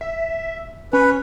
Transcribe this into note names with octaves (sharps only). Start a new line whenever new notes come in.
E5
C#4 B4